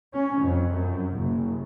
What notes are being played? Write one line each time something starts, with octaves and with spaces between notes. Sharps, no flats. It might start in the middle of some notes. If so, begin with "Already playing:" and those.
C#4
F2
F#2
F#1